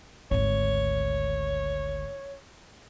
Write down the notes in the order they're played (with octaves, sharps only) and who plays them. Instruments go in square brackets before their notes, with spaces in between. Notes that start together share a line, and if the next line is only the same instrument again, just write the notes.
[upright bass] G#1 D2 [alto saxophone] C#5